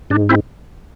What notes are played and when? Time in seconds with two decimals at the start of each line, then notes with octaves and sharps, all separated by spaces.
0.10 G#2 D4
0.29 C4 E4